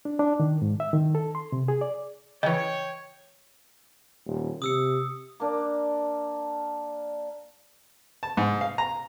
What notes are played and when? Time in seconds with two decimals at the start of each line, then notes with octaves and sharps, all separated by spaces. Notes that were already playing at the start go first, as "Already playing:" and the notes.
0.05 D4
0.19 D4
0.40 D#3
0.62 G#2
0.80 E5
0.93 D#3
1.15 A4
1.35 C6
1.52 C3
1.68 G#4
1.81 D5
2.43 C#3 E3 C#5 D#5 G5
4.26 D#1
4.62 C3 D#6 E6 C#7
5.40 A#3 D4
8.23 A5
8.37 G#2
8.61 F5
8.78 A#5